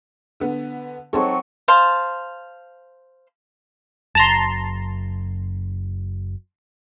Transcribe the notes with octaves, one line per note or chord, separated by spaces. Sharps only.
D3 B3
F#3 G#3 C4 D#4 A4 C#5
C5 F5 A5
F#1 F#2 A5 A#5 C6